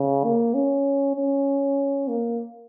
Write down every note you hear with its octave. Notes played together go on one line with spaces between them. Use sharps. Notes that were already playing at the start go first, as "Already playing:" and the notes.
Already playing: C#3
A#3
C#4
C#4
A#3